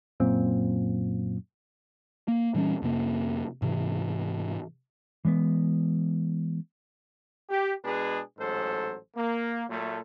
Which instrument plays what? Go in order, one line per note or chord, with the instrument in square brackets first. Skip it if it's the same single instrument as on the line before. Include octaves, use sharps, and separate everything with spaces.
[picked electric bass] F#2 A#2 C4
A#3
A#2 E3 G3 C#4
F2 C3 A#3
G#2 C3 E3
E3 G#3 A#3 B3
[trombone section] G4
B2 G#3 D4 G#4 B4
A1 G#2 F#3 A4 C5
A#3
A#2 F#3 A3